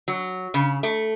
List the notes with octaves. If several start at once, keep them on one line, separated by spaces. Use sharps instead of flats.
F#3
C#3
A3